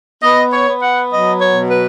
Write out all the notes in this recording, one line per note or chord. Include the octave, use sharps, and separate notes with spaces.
B3 D#5
C#5
B3
F#5
F#3 D#5
C#5
B2
B4